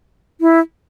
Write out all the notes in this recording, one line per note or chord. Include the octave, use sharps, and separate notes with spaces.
E4